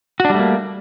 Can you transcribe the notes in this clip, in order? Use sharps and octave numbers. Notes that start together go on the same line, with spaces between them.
G3 A3 A#3 D4 F#4